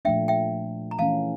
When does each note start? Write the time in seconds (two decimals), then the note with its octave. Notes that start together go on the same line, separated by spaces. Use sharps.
0.05 A#2 F3 A3 D4 E5 G5
0.28 E5 G5
0.91 A#5
0.98 E3 A3 C#4 F5 A5